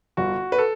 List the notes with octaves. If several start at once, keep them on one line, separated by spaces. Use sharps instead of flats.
G1 F#4
B4
A4